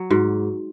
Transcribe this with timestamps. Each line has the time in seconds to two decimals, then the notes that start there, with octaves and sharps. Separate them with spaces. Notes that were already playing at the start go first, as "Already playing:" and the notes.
Already playing: F#3
0.10 G#2 F#4